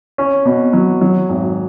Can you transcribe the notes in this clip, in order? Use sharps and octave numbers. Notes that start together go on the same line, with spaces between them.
C#4
B2
F#3
F#3
G#1